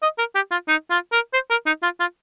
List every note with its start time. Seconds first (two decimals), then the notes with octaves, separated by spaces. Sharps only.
0.03 D#5
0.18 A#4
0.35 G4
0.51 F4
0.68 D#4
0.90 F4
1.12 A#4
1.34 C5
1.50 A#4
1.66 D#4
1.83 F4
2.00 F4